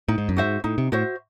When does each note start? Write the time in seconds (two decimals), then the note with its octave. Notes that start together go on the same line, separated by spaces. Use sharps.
0.08 A2 D#4
0.18 G#2
0.29 F#2
0.36 G#2 F#4 C5 E5
0.64 A2 D#4
0.78 C3
0.92 A2 F#4 C5 E5